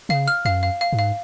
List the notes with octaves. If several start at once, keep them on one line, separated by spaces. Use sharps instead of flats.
C#3 F5
F6
F#2 F5
F5
F5
G#2
F5